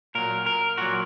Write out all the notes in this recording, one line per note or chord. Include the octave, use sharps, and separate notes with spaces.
A#2 F#3 A#4
A#4
A#2 F#3 F#4